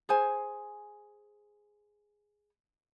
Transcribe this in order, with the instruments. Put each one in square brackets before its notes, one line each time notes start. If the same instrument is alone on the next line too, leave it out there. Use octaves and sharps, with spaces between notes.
[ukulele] G#4 C5 G#5